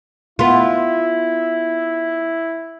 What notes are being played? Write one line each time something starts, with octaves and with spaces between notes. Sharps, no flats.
B3 E4 F4